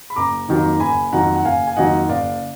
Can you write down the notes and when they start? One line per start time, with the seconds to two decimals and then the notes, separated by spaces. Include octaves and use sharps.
0.10 B5
0.16 F#1 A#5 D6
0.49 F2 D#3 F#3 A#3
0.80 F#1 G#5 B5
1.13 F2 D#3 F#3 A#3 F#5 A#5
1.36 F#5
1.45 F#1 F5 G#5
1.67 G#5
1.76 F2 D#3 F#3 A#3 D#5 F#5
2.09 F#1 D5 F5